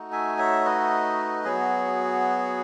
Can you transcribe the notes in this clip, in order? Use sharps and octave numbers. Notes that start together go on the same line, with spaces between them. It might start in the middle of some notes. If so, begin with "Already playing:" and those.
Already playing: A3 D#4 F#4
E5 G#5
C#5 E5
B4 D#5
F#3 B3 F#4 G#4